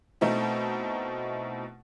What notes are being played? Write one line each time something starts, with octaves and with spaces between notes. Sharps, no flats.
B2 A3 C4 D#4 E4